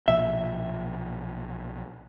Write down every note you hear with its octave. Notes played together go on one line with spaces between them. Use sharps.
B1 A#2 F3 E5